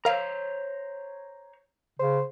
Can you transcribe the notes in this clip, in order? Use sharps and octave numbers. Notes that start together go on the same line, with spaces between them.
A#4 C5 C#5 F5 A#5
C#3 C5